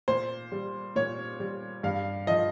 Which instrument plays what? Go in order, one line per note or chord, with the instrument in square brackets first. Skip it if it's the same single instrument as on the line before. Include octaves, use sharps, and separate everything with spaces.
[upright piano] A#2 C5
G3
A#2 C#5
G3
G2 F5
F3 D#5